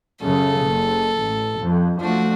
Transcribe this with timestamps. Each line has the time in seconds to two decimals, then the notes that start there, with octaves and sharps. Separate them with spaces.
0.23 F#2 C#3 A4
0.61 F#1
1.21 A1
1.59 F2
2.01 F3 A3 D4 F#4